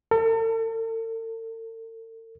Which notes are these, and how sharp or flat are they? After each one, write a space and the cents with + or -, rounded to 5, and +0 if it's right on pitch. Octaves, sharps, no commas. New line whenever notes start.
A4 +45